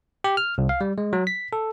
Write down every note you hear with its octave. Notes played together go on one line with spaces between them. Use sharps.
G4
F6
C2
F5
G3
G#3
F#3
B6
A4